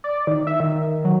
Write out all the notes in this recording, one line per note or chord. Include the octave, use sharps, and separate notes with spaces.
D5
D#3
E5
D#3
F#3